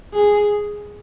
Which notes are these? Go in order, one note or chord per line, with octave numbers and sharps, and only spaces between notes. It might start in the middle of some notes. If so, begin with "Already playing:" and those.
G#4